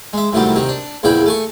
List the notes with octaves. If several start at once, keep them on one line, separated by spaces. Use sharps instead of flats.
G#3 E5
C2 A2 C3 D#3 F#3 G3
C3 D#3 C4
D4
A#1 E2 C#3 E4 D5 G5
A3 G#5 C#6